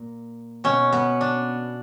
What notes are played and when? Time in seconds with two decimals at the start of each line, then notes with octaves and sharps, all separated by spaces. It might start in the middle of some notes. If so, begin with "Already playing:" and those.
Already playing: A#2
0.64 B2 C#4
0.92 B3
1.21 D4